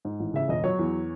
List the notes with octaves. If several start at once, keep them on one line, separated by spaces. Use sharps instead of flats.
G#2
A1
C#3 E5
E1 D#5
F#3 C#5
E2